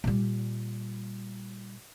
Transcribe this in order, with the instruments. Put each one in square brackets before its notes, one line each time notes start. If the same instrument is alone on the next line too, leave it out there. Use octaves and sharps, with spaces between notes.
[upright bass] A#2 G3